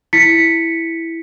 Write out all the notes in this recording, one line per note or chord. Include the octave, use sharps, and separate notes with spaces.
E4 B6 C#7